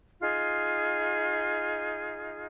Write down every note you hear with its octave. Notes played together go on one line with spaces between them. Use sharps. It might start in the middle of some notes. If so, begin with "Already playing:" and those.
D#4 F4 G#4